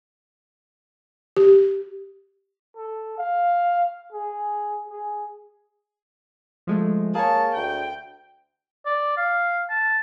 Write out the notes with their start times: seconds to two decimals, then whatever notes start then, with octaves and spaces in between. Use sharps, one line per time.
1.37 G4
2.76 A4
3.18 F5
4.12 G#4
4.90 G#4
6.67 F3 G#3 A3
7.15 A#3 G#4 C#5 A5
7.56 D2 G5
8.86 D5
9.17 F5
9.70 A5